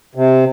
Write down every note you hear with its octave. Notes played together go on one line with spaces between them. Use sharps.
C3